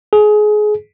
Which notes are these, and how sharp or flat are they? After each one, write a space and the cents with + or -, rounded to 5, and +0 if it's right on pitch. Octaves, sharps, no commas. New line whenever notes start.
G#4 +25